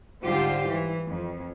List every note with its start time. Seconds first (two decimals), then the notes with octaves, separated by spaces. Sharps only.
0.23 G#2 D3 G3 F4 G4 C5
0.69 E3
1.09 F2